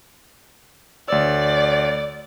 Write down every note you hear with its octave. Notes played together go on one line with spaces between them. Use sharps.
D2 C#5 D5 E6